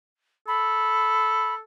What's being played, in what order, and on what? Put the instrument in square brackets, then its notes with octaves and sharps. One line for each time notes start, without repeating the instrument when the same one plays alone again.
[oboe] A4 [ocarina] B5